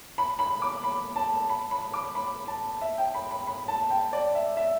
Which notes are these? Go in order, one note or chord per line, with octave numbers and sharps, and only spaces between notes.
B5
B5
D6
B5
A5
B5
B5
D6
B5
A5
E5
G5
B5
B5
B5
A5
G5
D5
E5
E5